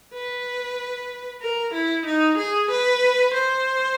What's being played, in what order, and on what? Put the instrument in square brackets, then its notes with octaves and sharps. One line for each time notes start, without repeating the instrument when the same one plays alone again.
[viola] B4
A#4
E4
D#4
G#4
B4
C5